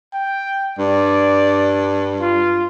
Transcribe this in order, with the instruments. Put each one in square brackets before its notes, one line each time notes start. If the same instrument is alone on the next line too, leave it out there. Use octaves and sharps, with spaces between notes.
[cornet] G5
[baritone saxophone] G2 [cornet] D5
[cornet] F4